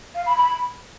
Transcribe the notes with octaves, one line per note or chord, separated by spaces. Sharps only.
F5
B5
B5